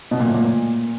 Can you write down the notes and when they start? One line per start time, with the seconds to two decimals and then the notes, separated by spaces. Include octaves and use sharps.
0.11 B2
0.20 A#2
0.27 A2
0.34 A#2
0.45 A#2